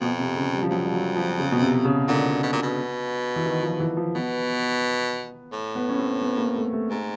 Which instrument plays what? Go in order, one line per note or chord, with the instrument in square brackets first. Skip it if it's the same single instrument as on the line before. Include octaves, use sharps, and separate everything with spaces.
[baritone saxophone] F2 [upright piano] B2
[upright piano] C3
C#3
G3
F3
[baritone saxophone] F2 [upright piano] F#3
[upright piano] G3
F#3
F3
C#3
B2
C3
C#3
[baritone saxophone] A#2 [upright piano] D3
[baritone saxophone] B2
A#2
B2
[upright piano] E3
D#3
F3
E3
F3
[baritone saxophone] B2 [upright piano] B3
[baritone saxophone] A2
[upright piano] B3
C#4
C4
B3
A#3
A3
A3
[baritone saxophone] G#2 [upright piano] A3